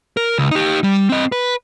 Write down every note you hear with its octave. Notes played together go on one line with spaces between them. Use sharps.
A#4
C#2
D#4 G4
G3
C4 D#5
B4